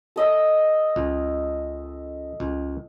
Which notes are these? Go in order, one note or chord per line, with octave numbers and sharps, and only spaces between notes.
A4 D#5 E5
C#2
C#2